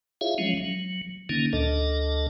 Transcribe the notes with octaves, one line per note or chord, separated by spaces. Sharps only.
E4 F4 G#4 C#5 E5 F5
F3 F#3 G#3 C#4
F#3
D3 D#3 A#3 C#4 D#4
D2 A#2 D4 A4 D#5